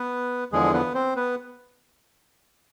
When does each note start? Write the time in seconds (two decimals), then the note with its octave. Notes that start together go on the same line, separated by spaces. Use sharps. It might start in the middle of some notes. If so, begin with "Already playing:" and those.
Already playing: B3 B4
0.52 E2 D3 F3 G#3 G#4
0.73 B3 B4
0.95 C4 C5
1.16 B3 B4